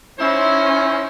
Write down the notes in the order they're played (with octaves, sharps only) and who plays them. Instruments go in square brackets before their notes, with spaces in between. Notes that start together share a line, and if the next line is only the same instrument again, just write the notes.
[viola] C#4 [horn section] D#4 E4 C5